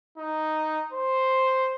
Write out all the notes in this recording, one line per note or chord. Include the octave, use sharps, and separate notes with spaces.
D#4
C5